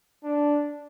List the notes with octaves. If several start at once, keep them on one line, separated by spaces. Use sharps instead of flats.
D4